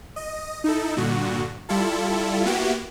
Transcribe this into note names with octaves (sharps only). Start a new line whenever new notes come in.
D#5
D#4 E4 A4
G2 A#2 D3 F#4
G3 E4 F4 A4
A#3 B3 E4 F#4 G4